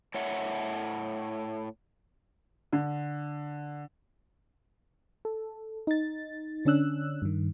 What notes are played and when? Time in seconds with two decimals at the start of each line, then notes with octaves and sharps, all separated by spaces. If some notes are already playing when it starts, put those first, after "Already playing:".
0.14 A2 C#5 E5 F#5
2.73 D3
5.25 A4
5.87 D#4 A6
6.65 D3 C#4 D4 E6 F#6
7.22 G2 D#3